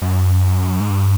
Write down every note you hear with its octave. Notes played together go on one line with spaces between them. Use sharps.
F#2
G#2
G2